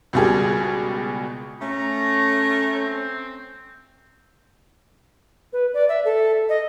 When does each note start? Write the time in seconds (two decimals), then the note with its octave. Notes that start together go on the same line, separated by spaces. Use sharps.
0.13 C#2 B2 G3 G4 G#4 A#4
1.60 A3 C#4 A#5
2.73 C4
5.53 B4
5.74 D5
5.89 E5
6.05 A4
6.49 D#5